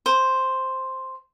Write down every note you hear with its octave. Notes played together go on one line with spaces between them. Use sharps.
C5